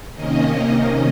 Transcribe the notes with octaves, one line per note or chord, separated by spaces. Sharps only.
C3 D#3 A#3 C#4 D#5